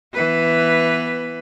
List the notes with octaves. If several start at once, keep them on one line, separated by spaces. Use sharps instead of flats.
E3 B3 B4